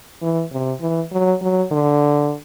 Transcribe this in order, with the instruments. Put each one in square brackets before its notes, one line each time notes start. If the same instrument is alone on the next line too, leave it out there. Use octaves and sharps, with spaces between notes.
[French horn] E3
C3
E3
F#3
F#3
D3